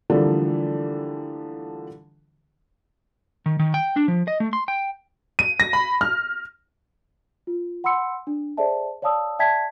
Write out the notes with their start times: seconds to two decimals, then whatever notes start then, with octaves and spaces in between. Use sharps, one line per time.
0.10 D3 E3 F3 G3 A3 A#3
3.46 D#3
3.59 D#3
3.74 G5
3.96 D4
4.08 F3
4.28 D#5
4.40 A3
4.53 C6
4.68 G5
5.39 D#7
5.60 A#6
5.73 B5
6.01 F6
7.47 F4
7.84 F#5 B5 C6 E6 C#7
8.27 D4
8.57 G#4 A4 C5 D5 E5 A5
9.02 C#5 D5 F5 A5 D#6 E6
9.39 D5 E5 G5 A5 G#6 B6